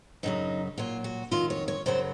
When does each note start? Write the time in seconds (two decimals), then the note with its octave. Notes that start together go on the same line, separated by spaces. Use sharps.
0.23 F#2 C#3 F#3 D#4
0.78 A#2 F#3 F4
1.04 F#4
1.31 F2 D#3 F#3 F4
1.50 C#5
1.68 C#5
1.86 F#2 C#3 F#3 C5